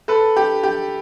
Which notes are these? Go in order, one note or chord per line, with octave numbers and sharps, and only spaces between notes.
A4 B4
G4
G4